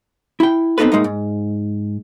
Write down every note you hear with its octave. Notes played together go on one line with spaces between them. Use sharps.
E4 G5
B3 C4 D4 D#4 A4 B4
A2 G#3 A#3 D#4
G#2